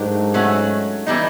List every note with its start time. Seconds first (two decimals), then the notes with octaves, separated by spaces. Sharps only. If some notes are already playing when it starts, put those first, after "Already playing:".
Already playing: G#2 F#3 A3 D4 G4 A#4
0.34 F#3 A3 C#4 F#4
1.07 E3 G3 B3 D#4